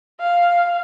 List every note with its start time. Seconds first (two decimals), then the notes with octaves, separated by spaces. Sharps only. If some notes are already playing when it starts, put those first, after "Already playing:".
0.21 F5